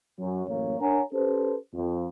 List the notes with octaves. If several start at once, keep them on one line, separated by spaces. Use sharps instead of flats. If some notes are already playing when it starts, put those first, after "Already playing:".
F#2
A1 F#2 A#3 C#5
D4 A#4 C#5 F#5 G#5 A#5
C#4 G4 A4 B4 C5
F2